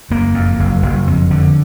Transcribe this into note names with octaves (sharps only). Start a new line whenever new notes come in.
F#1 A#3
F2
F#1
F#1
F2
D3